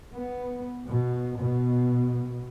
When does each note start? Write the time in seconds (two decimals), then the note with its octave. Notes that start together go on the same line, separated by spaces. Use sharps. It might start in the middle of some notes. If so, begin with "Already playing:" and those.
0.15 B3
0.86 B2
1.40 B2